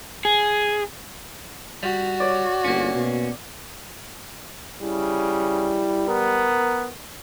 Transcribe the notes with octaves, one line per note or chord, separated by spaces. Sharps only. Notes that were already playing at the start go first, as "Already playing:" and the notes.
G#4
G3 F#4
C#5 D5
G1 A#3 C#4
B2
C#3 G3 E4
B3 A#4